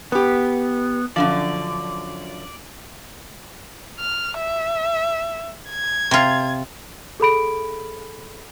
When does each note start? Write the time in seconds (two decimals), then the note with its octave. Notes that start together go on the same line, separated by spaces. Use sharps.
0.12 B3 G4 B4
1.16 F#2 D3 F3 D5
3.99 F6
4.37 E5
5.70 G#6
6.11 C3 F4
7.20 G#4 A4 B5 D7